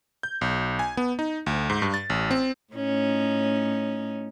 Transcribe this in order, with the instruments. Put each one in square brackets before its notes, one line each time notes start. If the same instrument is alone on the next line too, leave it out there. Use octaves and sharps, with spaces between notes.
[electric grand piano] G6
B1
G#5
B3
D#4
D2
G#2
G2
A6
A1
C4
[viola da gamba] A2 C#4 D#4